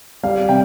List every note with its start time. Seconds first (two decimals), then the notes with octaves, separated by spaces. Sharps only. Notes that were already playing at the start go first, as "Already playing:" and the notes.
0.23 G3 F5
0.49 C3 G5